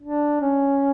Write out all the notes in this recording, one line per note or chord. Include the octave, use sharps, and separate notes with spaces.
D4
C#4